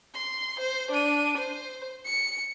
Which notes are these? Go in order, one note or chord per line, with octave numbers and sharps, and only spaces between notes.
C6
C5
D4 D#7
C5
C#7